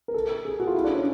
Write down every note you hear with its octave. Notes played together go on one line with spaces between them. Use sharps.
A#4
A4
G#4
F#4
F4
E4
D4
C#4